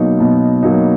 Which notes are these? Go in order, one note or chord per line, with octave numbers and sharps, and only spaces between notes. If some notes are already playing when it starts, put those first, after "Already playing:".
Already playing: B2 F#3 A#3 D#4
B2
F#3 A#3 D#4